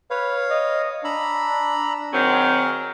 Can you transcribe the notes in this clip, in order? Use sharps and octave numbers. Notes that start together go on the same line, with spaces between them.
B4 C#5 F5
D#5
D4 A#5 B5 E6
D#3 F#3 C4 G#4 A#4